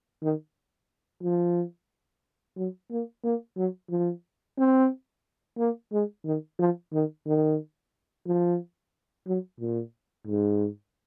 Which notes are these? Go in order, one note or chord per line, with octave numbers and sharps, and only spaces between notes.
D#3
F3
F#3
A#3
A#3
F#3
F3
C4
A#3
G#3
D#3
F3
D#3
D#3
F3
F#3
A#2
G#2